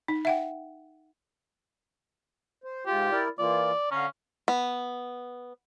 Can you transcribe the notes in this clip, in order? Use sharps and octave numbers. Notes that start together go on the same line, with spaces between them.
D#4
E5 F#5 G5
C5
G#2 F4 G4
E4 A#4 D5
E3 A#3 F4 D5
D3 C#4 F5 A#5
B3